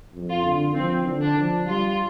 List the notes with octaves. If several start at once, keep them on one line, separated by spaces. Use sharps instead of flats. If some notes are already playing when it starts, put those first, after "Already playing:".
F2
F4
D3
F3 C4
D3
D4
F3
G3 F4